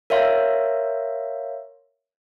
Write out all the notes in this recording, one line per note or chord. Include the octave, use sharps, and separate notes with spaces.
A#4 C#5 E5 F5 C6